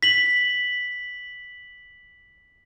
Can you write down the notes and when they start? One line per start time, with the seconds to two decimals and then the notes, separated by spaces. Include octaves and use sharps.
0.03 B6 F#7